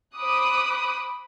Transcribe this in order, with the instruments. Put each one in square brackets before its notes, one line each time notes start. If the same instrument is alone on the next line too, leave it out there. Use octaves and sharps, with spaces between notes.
[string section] C5 B5 D6 D#6 F#6